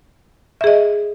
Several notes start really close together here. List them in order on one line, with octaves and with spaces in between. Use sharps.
E5 G#4 D#5